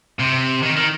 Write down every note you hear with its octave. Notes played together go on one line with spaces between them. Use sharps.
C3
D#3
D#3